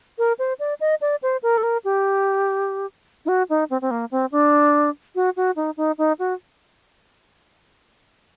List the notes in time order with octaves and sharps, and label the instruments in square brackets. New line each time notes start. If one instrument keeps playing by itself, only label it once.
[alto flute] A#4
C5
D5
D#5
D5
C5
A#4
A4
A#4
G4
D#4
F#4
D#4
C4
C4
A#3
C4
D4
F#4
F#4
D#4
D#4
D#4
F#4